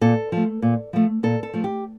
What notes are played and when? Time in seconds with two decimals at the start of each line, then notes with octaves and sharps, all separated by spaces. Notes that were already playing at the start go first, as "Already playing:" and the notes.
0.01 A#2 A4
0.32 F3 A3
0.62 A#2
0.93 F3 A3
1.23 A#2 A4
1.43 A4
1.54 F3 A3
1.64 G4